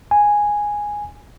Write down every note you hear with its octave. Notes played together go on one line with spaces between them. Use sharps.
G#5